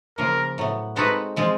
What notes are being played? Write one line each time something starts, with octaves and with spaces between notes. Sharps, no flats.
C#3 F3 A#3 A#4
A2 F#3 B3
G#3 C4 D#4 F#4 A4 B4
F3 G#3 C4 F4 G#4